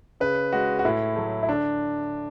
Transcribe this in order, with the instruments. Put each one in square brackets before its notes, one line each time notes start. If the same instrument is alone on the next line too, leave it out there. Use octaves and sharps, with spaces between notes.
[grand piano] C#3 B4
G#3 F#4
F#4
A2 E4
F#3 A3
E4
D3 D4